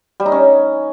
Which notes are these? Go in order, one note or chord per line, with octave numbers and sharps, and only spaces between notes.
G3
D#4
C#4